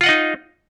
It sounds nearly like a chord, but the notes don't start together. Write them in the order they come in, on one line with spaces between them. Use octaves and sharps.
F4 F#5 D#5 D#4